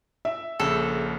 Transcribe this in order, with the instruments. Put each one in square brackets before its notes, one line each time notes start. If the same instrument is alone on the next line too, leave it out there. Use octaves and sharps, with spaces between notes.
[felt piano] E5
[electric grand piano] A#1 C#3 [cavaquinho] A4